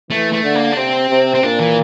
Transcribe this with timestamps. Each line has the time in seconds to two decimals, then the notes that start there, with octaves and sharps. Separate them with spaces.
0.10 E3 A3
0.33 A3
0.44 D3
0.55 A#3
0.72 D4
0.77 C3 C4
1.10 C3
1.34 C4
1.43 A#2 D4
1.60 E3